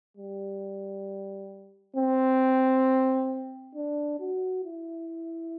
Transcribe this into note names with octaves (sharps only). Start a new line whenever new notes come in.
G3
C4
D4
F#4
E4